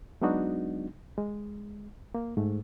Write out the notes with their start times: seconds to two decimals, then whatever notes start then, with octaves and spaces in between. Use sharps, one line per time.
0.22 F#3 G#3 B3 D4 D#4 F#4
1.18 G#3
2.15 A#3
2.37 G#2 A3